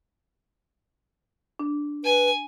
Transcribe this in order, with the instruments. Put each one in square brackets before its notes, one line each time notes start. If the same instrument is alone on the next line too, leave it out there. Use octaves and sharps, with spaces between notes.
[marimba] D4
[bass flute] B4 [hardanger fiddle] G#5